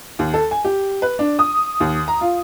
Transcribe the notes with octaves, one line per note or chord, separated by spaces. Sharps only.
D#2
A4
G#5
G4
B4
D4
D#6
D#2
A#5
F4